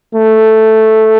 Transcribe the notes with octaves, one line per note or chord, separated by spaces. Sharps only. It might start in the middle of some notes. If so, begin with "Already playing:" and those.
A3